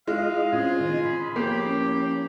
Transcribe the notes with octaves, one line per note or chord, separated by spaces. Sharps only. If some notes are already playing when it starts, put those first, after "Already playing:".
G#3 E4 F4 D#5 F5
A2 C4 C#4 F4 G#4
D#3 D#5
B5
A2 F3 A#3 G4
C#4